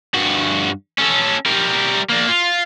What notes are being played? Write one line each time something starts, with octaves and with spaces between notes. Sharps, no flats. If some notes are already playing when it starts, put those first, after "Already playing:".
G2 F#4
C#4 A4
G3 A#4
A#3 D4
F4